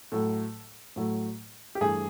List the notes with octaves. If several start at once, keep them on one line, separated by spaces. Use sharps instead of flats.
A2 F#3 A3 A4
A2 F#3 A3
G4
G2 E3 A3 G#4